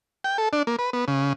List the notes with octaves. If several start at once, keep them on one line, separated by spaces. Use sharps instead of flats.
G5
A4
D4
A#3
B4
B3
C#3